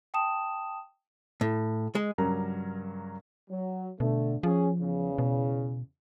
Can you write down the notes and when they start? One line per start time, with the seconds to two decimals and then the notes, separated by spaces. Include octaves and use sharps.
0.14 G5 A5 D#6 E7
1.41 A2
1.95 G#3
2.18 G2 C#3 F#3 A#4 A#5
3.50 F#3
4.00 B2 D3 A3
4.43 F3 C#4 G#4
4.81 E2 C#3
5.18 B2